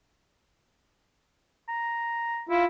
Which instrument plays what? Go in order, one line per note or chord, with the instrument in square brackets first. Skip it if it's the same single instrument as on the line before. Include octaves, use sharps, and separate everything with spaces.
[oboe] A#5
[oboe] E4 [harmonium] F4